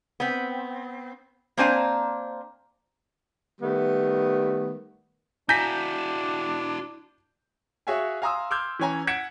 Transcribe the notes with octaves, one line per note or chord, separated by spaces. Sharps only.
B3 C4
A#3 C4 D4 C5 G#5 A#5
D#3 G3 A3 B3
D4 E4 F#4 G#5 A#5 G6 A#6 B6
F#4 G#4 C#5 E5 F5 G#5
F5 G#5 A#5 C6 D#6 E6
C6 D6 E6 F6 G6 G#6
E3 C#4 C#5 G#5 A#5
F#5 G#6 B6 C#7 D7 E7